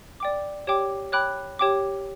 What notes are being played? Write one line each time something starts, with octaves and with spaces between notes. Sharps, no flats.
D5 G5 D6
G4 C#5 G5 D6
C#5 G5 B5 D6 F#6
G4 C#5 G5 D6